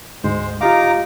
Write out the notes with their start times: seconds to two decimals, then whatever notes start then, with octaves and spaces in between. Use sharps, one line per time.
0.24 D2 G#2 G#3 C5
0.61 D#4 F4 G4 F5 A#5 D6